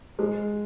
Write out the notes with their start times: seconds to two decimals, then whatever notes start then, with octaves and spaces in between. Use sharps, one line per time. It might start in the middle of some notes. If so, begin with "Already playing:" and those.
0.19 G#3